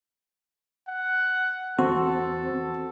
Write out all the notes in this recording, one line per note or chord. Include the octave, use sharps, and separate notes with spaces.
F#5
E2 C4 F#4 A4